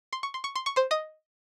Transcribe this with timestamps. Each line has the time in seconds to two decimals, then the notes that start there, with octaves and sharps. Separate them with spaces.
0.13 C6
0.23 C#6
0.34 C6
0.44 C#6
0.56 C6
0.66 C#6
0.76 C5 C6
0.91 D#5 D#6